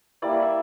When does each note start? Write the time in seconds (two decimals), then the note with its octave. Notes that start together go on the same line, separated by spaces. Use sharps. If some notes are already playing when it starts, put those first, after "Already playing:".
0.22 G3 A#3 E4 D5
0.42 E5